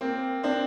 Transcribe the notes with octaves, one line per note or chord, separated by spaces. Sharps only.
A#3 C4
C4 D4